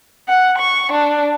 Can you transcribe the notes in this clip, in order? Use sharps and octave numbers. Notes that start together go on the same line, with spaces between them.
F#5
C#6
D4